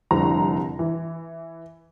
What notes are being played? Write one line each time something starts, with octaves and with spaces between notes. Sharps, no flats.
F1 C2 D3 A#5
E3